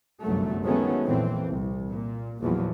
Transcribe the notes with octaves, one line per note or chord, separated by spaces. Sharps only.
G1 C2 F#2 F#3 A3
D#3 F#3 G#3 A3 B3 C#4
A#1 F2 A#2 E3 C4
C2
A#2
A#1 E2 A#2 F3 F#3